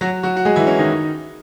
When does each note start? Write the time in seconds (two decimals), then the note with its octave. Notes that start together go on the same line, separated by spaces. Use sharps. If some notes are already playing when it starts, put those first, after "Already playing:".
0.01 F#3 F#4
0.23 F#3 F#4
0.37 F#4
0.45 G#3 G#4
0.56 E3 E4
0.67 C#4
0.79 D#3 D#4